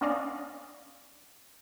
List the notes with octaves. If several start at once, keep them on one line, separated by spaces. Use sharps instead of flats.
B3 C#4 D4 D5 D#5 F5